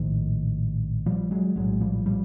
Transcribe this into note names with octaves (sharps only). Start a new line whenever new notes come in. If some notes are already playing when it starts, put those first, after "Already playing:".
Already playing: A#1 A2 D#3 F3
F3 G3
F#3 G#3
A#1 A2 F#3 G#3
F3 G3
F3 G3